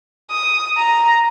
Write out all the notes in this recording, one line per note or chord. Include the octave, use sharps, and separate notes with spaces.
D#6
A#5